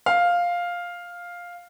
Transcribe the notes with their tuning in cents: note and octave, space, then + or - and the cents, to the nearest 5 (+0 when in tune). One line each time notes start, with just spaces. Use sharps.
F5 +5